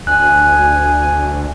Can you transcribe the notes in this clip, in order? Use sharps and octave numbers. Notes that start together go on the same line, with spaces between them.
D2 G#5 F#6